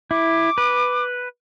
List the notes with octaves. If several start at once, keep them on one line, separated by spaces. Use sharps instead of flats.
E4 D6
B4